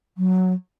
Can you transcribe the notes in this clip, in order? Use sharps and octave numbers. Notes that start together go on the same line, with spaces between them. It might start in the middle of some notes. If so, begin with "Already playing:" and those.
F#3